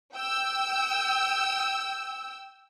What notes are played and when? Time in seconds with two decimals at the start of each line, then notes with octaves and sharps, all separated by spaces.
0.16 G5 E6